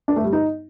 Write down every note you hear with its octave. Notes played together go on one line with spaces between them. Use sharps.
D4
A3
G3
D#4